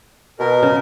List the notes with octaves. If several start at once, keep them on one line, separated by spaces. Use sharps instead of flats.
B2 A#4
C#3